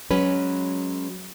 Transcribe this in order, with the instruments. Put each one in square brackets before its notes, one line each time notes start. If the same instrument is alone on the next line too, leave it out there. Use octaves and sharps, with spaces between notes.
[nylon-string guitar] F#3 G#3 C#4 B4